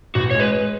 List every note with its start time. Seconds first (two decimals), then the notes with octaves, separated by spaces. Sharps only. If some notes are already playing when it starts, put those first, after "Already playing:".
0.15 A1 F#4
0.31 G#3 C#5
0.40 B4
0.52 G#3